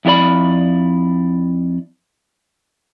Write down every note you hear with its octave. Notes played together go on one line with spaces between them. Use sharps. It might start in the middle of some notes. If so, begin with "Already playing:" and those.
F2 E4 G4 D5 B5